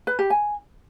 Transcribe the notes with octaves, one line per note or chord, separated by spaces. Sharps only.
B4
G4
G#5